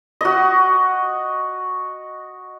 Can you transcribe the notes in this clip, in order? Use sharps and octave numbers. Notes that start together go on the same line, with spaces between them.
F#4 D#5